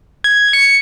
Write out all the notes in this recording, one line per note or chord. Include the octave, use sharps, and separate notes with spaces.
G#6
C#7